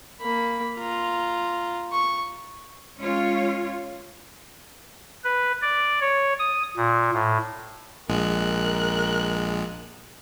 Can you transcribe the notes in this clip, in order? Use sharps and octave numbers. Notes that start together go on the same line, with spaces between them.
A#3 B5
F4 A#5
C#6
G#3 C#4 F4 C#5
B4
D5
C#5
D#6
A#2
A2
A#1 G#3 A#4 F#6